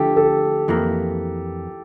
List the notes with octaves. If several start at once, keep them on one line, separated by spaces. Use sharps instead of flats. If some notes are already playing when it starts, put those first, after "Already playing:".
Already playing: D3 F3 A3 E4 G4 A4
A4
F2 E3 A#3